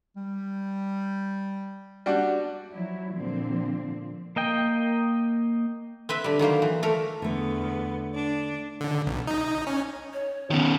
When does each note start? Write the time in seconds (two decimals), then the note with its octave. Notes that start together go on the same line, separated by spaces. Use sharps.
0.16 G3
2.06 G3 D4 F#4
2.72 F3 F#3 E4
3.15 A#2 D3 F3 C4
4.36 A#3 D#5 G5
6.09 C4 B4 E5
6.24 D3 G3
6.39 D#3 F#3 A#3 C5
6.62 E3
6.83 A3 A#4
7.22 E2 D3 A3 B3
8.14 D4
8.81 D3
9.06 B1
9.27 D#4
9.67 C#4
10.13 C#5
10.51 D#3 B3 C#4